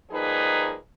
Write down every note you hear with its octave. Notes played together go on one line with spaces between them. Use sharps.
F3 G3 A#3 D#4 G#4 B4